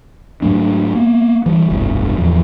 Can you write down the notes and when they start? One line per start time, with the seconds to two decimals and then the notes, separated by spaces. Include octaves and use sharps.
0.42 G#2 F#3 A3 D4
0.95 A#3 B3
1.46 E3 G3
1.70 F1 C2 G2 B2
2.17 D1 E2 F3